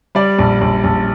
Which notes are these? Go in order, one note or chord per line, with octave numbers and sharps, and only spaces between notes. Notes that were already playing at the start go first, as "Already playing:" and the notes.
G3 D5
A#1
A#1
A#1